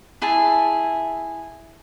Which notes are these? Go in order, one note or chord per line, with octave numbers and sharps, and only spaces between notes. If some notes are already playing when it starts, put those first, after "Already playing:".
E4 G#4 E5 A5